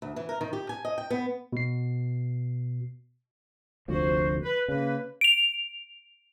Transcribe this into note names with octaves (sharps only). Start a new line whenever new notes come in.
D2
E3
A#4
D#3
G4
G#5
D#5
G5
B3
B2 C7
F1 D2 F3 F#4 C5
B4
C#3 A#3 B4
D7 F7